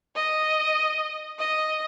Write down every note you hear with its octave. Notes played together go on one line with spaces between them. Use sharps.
D#5
D#5